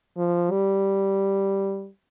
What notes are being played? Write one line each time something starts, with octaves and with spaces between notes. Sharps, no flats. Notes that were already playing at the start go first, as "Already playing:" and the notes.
F3
G3